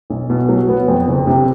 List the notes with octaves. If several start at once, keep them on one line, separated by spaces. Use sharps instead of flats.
B1
B2
F#3
B3
F2
F#1
C3